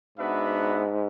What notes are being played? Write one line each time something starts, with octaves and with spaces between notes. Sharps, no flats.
G#2 B3 D4 F#4 B4 E5